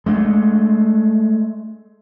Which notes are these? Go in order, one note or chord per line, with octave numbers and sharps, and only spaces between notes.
G#3 A3 D4